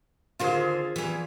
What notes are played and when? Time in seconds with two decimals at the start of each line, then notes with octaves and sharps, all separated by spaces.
0.39 D#2 D3 F4 G#4 C5
0.96 E2 E3